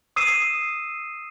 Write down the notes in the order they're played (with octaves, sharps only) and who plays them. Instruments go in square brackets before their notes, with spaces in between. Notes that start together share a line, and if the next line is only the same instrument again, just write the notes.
[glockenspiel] D#6 E6 C7 D#7 E7